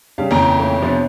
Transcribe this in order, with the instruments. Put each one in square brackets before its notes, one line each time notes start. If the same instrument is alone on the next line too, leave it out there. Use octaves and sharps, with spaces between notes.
[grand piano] G2 C#3 G3 [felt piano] F5
[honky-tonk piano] F2 G5 [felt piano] A#2 C#3 E3 [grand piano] C#5 A#5
[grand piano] A3 C#5
[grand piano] C3 F3 B3 [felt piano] D4 C#5